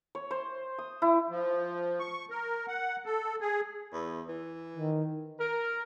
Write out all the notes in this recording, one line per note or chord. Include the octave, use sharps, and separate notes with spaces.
C#5
C5
D#6
E4
F3
C#6
A#4
F#5
A4
G#4
E2
E3
D#3
A#4